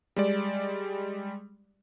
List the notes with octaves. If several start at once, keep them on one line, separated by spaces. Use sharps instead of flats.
G3 G#3 D5